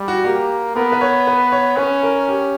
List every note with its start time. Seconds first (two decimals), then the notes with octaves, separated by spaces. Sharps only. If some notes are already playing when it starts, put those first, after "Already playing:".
Already playing: G3
0.08 F#4
0.24 A#3 G4
0.75 B3 A#4
0.92 B4
1.01 C#5
1.27 B4
1.52 C#5
1.77 C#4 B4
2.03 A#4
2.28 G4